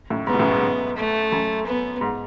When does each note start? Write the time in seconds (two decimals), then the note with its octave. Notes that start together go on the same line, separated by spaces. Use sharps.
0.10 F#2 A2
0.27 G#2 B3
0.34 B2
0.39 F#2 A2
0.51 G#2
0.62 F#2
0.97 A3
1.32 F#2
1.66 B3
2.01 G#2